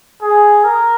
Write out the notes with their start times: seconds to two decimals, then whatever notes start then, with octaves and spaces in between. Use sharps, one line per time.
0.22 G#4
0.64 A#4